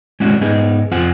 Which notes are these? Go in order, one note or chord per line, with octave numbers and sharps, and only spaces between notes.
G#3 C#4 D4 E4 F#4
G#2 G#3 B3 D#4 G#4
F2 C4 F4 F#5 G#5